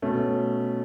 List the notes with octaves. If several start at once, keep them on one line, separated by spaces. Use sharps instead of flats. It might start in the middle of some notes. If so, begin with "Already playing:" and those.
B2 A3 C#4